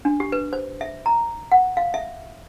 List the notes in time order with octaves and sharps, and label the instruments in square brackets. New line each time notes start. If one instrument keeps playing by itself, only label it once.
[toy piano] D4
G4
B4
C5
E5
A#5
F#5
F5
E5